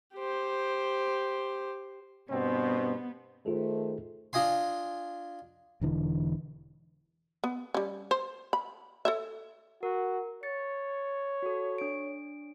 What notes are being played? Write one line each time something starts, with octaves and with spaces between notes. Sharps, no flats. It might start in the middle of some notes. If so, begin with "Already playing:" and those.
G4 C5
G2 B2 B3 C4
D#3 A3 F4 G#4 A4 C5
D4 F4 D#5 G#5 C6
E1 D3 E3
B3
G3 C#4
C5
B5
A4 C#5 E5
F#4 A#4
C#5 A6 C#7
F#4 A4
D4 D7